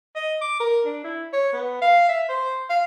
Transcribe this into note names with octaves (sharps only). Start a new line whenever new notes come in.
D#5
D6
A#4
D4
E4
C#5
B3
F5
E5
C5
F5